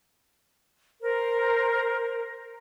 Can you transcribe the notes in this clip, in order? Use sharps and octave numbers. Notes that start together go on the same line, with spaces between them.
A#4 C5